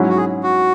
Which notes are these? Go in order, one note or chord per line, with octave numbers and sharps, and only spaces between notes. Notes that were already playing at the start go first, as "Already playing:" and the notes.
Already playing: G#2 F#3 C#4 E4
F#4
G#4
F#4